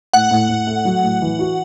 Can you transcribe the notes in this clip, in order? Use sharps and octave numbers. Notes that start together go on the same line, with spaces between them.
A2 F#5
A2
A2
A3
F#3
A2
E3
F#4